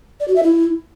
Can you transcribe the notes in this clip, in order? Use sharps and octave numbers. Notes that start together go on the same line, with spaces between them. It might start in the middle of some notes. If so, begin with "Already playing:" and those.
D5
F#4
E5
E4